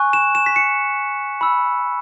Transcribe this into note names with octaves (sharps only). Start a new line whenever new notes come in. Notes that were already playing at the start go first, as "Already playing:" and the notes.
Already playing: G#5 C#6 F#6
E7
E7
B6
C#7
B5 E6